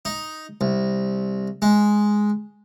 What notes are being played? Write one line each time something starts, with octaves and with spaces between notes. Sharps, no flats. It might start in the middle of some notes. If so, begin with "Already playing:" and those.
D#4
C2
G#3